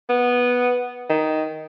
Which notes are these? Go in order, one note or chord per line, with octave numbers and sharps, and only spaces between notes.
B3
D#3